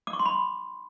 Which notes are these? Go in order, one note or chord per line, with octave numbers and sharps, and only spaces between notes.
D6
C#6
C6
B5